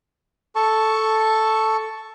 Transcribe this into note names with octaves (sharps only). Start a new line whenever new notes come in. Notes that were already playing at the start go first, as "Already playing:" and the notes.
A4 A5 C#6